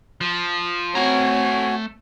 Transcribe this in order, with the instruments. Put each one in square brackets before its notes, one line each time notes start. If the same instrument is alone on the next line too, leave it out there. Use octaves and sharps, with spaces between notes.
[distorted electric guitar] F3
[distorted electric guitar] A3 A#5 [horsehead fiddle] C4 C#5 [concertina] F#4 G#5